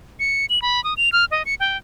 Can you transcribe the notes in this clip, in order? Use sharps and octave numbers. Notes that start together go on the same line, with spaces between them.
C#7
F#7
B5
D#6
F7
F6
D#5
C#7
G5